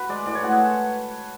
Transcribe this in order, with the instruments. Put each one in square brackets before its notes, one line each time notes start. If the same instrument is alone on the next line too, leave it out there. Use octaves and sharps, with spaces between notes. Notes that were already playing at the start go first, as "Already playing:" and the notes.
Already playing: [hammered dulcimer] F#4 B4
G#3 D5
A2 D5
C#5
G#3 F#4
G#4
A4